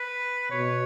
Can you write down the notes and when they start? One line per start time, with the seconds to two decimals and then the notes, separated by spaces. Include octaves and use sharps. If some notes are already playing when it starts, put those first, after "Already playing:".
Already playing: B4
0.51 B2 C#5